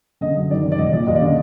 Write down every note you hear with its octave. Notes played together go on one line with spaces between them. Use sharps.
D3 D#5
F#2
D#3 D5
C3
D5
A#1 D#5
A#2 D5
D#2 D#5
D5
D3 D#5